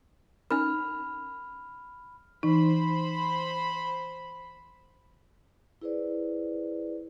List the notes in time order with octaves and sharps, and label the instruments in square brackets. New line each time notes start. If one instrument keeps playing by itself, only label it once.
[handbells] C#4 D#4 A#4 [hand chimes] B5 F6
[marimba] E3 D#4 [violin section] C5 B5
[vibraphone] E4 G#4 B4 C5 D5